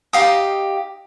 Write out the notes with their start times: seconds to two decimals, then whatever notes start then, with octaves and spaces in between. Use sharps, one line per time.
0.13 D#4 G4 F5 D#6